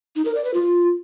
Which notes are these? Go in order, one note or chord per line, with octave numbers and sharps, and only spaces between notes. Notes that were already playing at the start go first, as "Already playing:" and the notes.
D#4
A#4
D5
B4
F4